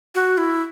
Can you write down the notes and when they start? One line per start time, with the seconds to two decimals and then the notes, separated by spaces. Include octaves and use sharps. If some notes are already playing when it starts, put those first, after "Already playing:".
0.15 F#4
0.38 E4